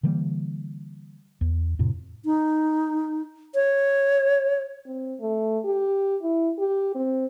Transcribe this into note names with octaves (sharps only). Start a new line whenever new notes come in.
D3 E3 G3 A#3
E2
F2 A2 C3
D#4
C#5
C4
A3
G4
E4
G4
C4